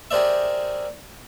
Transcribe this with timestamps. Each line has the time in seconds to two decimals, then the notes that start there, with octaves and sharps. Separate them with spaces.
0.11 G4 G#4 A#4 C5 D5 E5